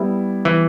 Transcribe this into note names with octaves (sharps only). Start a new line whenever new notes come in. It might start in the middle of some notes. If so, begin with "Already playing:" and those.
Already playing: G3 B3 E4
E3